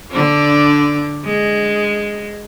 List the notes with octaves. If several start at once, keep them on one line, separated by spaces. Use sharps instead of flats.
D3 D4
G#3